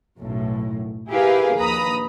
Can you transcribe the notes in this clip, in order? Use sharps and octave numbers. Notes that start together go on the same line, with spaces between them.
B1 F#2 A2
E4 G4 G#4 A#4 B4 F5
A#1 D#2 B4 A#5 B5 D#6